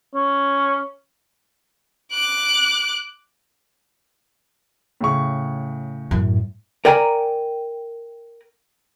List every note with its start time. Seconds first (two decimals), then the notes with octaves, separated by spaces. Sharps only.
0.14 C#4
2.12 D6 F#6
5.01 A2 C#3 C#6
6.11 F#2 A2
6.85 A#4 D5 G5 G#5 A#5